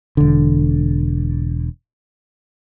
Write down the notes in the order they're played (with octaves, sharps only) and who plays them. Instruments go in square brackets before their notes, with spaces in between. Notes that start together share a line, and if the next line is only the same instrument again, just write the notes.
[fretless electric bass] E1 D3